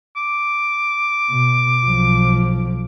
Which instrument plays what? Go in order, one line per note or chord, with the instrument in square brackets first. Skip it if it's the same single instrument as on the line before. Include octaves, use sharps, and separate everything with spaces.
[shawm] D6
[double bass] B2
B1 F3